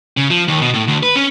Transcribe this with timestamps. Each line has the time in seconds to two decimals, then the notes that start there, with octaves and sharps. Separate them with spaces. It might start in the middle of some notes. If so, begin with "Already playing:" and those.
0.17 C#3
0.31 F3
0.48 D#2
0.61 B2
0.74 A2
0.87 D2
1.03 B4
1.16 C#4